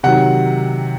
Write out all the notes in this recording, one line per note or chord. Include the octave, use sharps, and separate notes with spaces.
C3 D#3 F#3 F#5